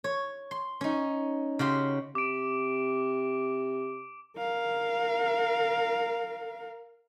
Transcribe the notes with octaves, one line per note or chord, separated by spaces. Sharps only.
C#5
C6
C#4 D#4
C#3 F#4 G4 C6
C3 D6 D7
A#4 F5